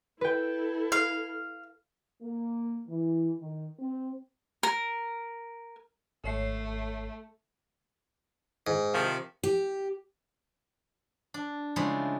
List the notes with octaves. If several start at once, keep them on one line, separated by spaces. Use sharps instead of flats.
E4 A4 B4 G5
F5
A#3
E3
D#3
C4
A#4
G#1 A3 C#5 C7
G#2
C3 D#3 F3
G4
D4
C#3 F3 G#3 A3 D4 E4